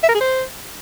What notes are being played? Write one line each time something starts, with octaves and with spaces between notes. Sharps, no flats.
E5
A#4
G#4
C5